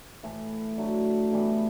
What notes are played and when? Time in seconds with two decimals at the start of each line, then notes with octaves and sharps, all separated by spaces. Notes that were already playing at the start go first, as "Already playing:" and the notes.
0.23 A2 E3 A3
0.77 D3 F#3 A3
1.32 A2 E3 G3 B3